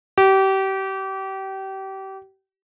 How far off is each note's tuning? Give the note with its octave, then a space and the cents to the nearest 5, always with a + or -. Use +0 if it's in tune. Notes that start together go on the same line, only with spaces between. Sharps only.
G4 -30